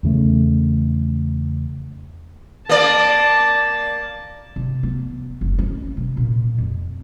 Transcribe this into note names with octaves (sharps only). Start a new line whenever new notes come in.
E2 C#3 A3
A#3 D5 A5
C3
B3
F#1
C#4
C3
A#2
F2